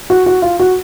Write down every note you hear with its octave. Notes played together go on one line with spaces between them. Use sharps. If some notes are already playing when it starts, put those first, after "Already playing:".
F#4
F#4
F4
F#4